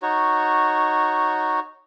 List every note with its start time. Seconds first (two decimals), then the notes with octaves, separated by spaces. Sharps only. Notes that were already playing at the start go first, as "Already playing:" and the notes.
0.02 D#4 F#4 C#5